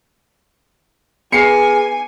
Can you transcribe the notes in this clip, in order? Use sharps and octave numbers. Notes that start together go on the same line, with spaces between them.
B3 G#4 B4 G#5 C7 C#7